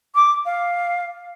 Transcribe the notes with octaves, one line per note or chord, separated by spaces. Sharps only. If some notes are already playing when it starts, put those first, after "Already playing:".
D6
F5